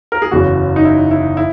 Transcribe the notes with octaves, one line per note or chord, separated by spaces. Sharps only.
A#4
G#4
F#1 E2 C#3 E3 F#4
D#4
E4
E4
E4